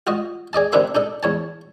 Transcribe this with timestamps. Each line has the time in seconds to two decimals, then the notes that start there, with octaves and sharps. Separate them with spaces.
0.07 F4 F#4 D#5
0.53 G#4 D5 D#5 A5
0.73 D#2 C3 D4 B4 E5 C6
0.95 D4 D#4 A4
1.23 E2 C#5 A5